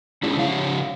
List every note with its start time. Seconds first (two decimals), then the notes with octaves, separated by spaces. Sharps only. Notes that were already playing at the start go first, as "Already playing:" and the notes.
0.23 G#3 C#4 D4 E4 G#4
0.36 C#3 F3 C#5 F5